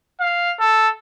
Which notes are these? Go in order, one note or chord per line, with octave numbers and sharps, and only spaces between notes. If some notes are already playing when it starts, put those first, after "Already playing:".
F5
A4